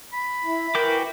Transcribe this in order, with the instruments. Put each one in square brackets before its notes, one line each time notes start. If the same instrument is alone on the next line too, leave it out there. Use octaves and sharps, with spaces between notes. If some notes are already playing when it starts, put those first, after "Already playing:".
[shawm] B5
[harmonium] E4
[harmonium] E3 [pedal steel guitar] F#4 G5 D6 [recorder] A#4